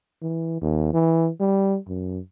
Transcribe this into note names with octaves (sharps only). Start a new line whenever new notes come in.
E3
D#2
E3
G3
F#2